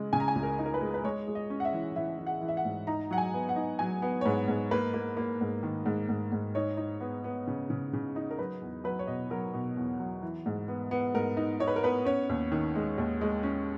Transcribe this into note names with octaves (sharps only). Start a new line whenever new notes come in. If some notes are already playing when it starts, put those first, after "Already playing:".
Already playing: C#3 G#3
C#3 G#5
A#5
G#5
C#2
A#4
D#4
A#4
B4
G#3
B4
G#3 C#5
G#3
D#5
C#4
F#5
E5
E3
E3 E5
E3
F#5
E3
E5
F#5
G#2
D#4 A#5
F#3 F#5
G#5
B3
F#5
D#4
F#3 G#5
B3
C#5
G#2 B4
G#2
A#3 B4
A#3
A#3
G#2
D#3
G#2
G#2
G#2
D#4 C#5
D#4
B3
B3
C#3
C#3
C#3
D#4
A#4
F#3 B4
E2
F#3 B4
C#5
B2 D#5
F#3 A#4
B2
E2
F#3
E3
G#2
B3
B3
G#2 A#4
D#4
D#4 C#5
B4
A#4
B3 B4
C#4 C#5
D#2
D#3
G#3
D#2
G#3
C#4